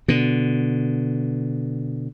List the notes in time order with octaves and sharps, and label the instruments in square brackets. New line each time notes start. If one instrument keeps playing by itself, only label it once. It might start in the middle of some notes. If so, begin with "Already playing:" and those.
[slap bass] B2 D3